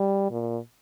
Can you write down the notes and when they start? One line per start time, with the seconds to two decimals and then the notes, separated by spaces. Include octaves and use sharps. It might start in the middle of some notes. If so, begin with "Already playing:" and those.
Already playing: G3
0.31 A#2